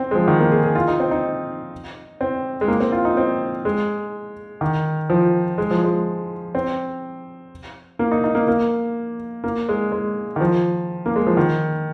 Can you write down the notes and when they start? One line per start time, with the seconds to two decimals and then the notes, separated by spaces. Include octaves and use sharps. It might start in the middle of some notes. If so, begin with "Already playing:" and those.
Already playing: C4
0.11 G#3
0.15 F3
0.28 D#3
0.40 A#3
0.51 G#4
0.63 G#4
0.75 F4
0.88 D#4
1.00 C4
1.11 D#4
2.21 C4
2.61 G#3
2.68 A#3
2.80 C4
2.92 F4
3.05 D#4
3.17 C4
3.65 G#3
4.61 D#3
5.10 F3
5.58 G#3
5.71 F3
5.84 G#3
6.55 C4
7.99 A#3
8.12 D#4
8.24 D#4
8.35 A#3
8.48 A#3
9.44 A#3
9.69 G#3
9.92 G#3
10.36 D#3
10.40 F3
11.06 A#3
11.16 G#3
11.27 F3
11.37 D#3